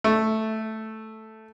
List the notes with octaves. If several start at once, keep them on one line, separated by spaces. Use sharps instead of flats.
A3